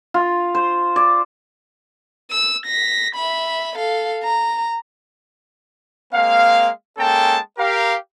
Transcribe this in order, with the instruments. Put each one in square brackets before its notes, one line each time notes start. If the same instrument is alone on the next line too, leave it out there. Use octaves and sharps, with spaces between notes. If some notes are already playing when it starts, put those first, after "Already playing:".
[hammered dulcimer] F4
C5
D5
[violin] E6
A#6 B6
E5 B5
A4 F5
A#5
[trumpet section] G#3 A#3 C4 F5
G#3 A#3 C#4 A4 G5 A5
G4 A#4 F5